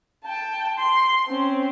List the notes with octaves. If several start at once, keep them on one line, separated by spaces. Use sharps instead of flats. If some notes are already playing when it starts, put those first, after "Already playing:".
G5 A5
C6
C4 C#4